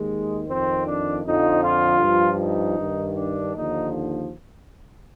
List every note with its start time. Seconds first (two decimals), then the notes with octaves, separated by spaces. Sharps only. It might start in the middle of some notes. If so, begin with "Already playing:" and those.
Already playing: D#2 D#3 G#3
0.47 F2 D#3 C4
0.86 D4
1.24 F2 D3 F3 D#4
1.63 F4
2.01 G2 F3
2.40 D#4
2.77 G2 D#3
3.16 D4
3.54 D#2 D3 F3 D#4